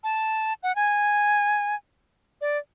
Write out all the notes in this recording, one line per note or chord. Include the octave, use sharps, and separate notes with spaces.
A5
F#5
G#5
D5